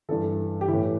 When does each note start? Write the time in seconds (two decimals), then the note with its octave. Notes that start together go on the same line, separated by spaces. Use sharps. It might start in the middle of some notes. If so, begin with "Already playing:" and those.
0.09 G2 E3 A4
0.61 G4
0.68 E3 E4
0.73 A2